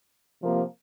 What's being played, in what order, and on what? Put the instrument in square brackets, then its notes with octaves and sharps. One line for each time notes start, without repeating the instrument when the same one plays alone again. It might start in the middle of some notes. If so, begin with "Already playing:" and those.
[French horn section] C3 F3 A#3